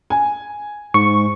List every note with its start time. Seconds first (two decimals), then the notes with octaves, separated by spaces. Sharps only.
0.10 G#5
0.94 G#2 C#6